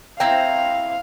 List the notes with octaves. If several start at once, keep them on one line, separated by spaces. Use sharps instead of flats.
C4 E4 F5 G5 A#5